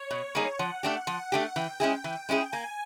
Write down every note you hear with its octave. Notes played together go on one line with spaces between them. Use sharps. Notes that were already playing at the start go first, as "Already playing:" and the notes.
Already playing: C#5
B2
G3 A#3 D#4 G#4
F3 F#5
A3 D4 G4
F3 F#5
A3 D4 G4
E3 G5
G#3 C#4 E4 G#4
E3
G#3 C#4 E4 G#4
A#3 G#5